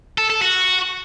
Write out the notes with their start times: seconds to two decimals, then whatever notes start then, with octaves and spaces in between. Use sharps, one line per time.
0.18 A4
0.30 A4
0.42 F#4